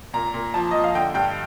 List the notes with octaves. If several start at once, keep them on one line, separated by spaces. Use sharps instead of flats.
A#2 A#5
A#2
F3 A5
F3 D#5
F5
D3 G5
G2 G5